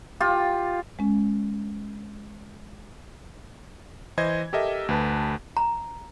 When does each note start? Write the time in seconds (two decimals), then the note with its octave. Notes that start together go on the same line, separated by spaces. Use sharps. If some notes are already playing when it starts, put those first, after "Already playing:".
0.20 F4 G4
0.99 G#3 C#4
4.18 E3 C5 D#5 G#6
4.53 G4 A4 A#4 D#5 E5
4.89 D2 B4 A5
5.57 A#5